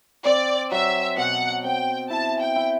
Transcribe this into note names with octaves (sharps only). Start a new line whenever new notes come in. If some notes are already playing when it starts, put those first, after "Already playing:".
C4 D5
F#3 E5
B2 F#5
C4 G5
E4 A5
G5
E4